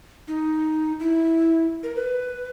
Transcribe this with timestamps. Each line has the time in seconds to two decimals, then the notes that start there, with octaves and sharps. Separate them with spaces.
0.28 D#4
1.00 E4
1.83 A#4
1.96 B4